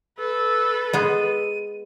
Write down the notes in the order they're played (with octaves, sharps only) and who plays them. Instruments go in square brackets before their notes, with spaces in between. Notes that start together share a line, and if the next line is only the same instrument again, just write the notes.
[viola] A4 B4 [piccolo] E6
[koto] G#3 B3 [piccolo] D#7